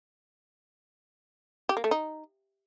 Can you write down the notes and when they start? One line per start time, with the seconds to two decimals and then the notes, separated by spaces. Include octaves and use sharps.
1.69 G4
1.77 A#3
1.84 A3
1.91 D#4